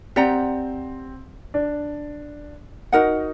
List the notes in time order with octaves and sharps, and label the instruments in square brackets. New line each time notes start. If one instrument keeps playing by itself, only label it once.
[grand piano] C4 [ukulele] G4 D5 F#5 A#5
[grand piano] D4
[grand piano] D#4 [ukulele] F#4 A#4 F#5